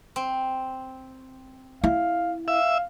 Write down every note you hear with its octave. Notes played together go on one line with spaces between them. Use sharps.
C4
E4 F5
E5 F5